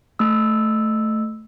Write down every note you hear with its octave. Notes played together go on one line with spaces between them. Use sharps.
A3 E6